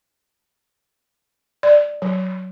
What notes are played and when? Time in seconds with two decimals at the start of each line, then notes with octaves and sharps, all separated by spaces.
1.63 D5
2.02 F#3